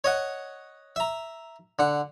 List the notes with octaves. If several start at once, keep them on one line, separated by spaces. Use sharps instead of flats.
C#5 D#5 F#5
E5 A#5
D3 F#5